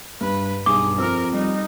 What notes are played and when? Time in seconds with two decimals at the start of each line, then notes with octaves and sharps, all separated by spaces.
0.21 G2 B4
0.66 B1 G2 G#4 D6
0.98 F2 A#4 C5 E6 F6
1.33 G3 D#4